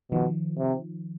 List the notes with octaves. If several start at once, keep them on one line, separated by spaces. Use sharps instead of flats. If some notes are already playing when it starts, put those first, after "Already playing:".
B2 D#3 F3
C3